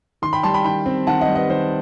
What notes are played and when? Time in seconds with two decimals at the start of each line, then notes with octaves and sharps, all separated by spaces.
0.22 D#3 C6
0.33 G5 B5
0.43 G3 A5 C6
0.54 G5 B5
0.65 D#3 G5 B5
0.86 C4
1.07 D#3 F#5 A5
1.21 D#5 F#5
1.28 G3
1.35 B4 D#5
1.49 D#3 C5